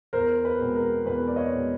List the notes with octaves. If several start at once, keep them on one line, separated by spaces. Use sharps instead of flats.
E2 A#4 C5
B4
B2 G#3 C4
A#4
E2 B4
D5
C#5 D#5
B2 G#3 C4